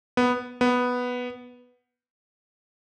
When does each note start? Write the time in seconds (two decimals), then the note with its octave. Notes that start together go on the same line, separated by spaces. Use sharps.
0.17 B3
0.61 B3